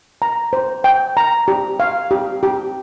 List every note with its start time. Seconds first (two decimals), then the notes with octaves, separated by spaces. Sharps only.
0.22 A#5
0.53 C5
0.84 G5
1.17 A#5
1.48 G4
1.80 F5
2.11 G4
2.43 G4